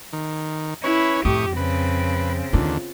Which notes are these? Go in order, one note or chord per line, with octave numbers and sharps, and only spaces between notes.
D#3
C#4 E4 B4 C#5
F2 A2 G4 C#6 D#6
C#3 C4 B4
D#2 D3 F4